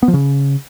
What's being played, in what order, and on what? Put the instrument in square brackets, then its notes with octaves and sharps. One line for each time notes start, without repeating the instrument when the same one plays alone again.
[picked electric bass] B3
F3
C#3